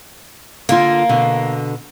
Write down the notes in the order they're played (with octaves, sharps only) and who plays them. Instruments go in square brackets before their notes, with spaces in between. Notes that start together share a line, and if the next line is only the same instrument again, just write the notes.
[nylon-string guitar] D3 F4 [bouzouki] A#3
[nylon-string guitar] B2 D3